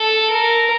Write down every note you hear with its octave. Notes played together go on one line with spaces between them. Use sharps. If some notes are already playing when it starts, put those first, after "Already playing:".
Already playing: A4
A#4